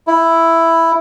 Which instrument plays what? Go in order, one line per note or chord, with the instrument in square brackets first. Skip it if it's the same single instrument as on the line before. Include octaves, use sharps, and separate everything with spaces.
[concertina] E4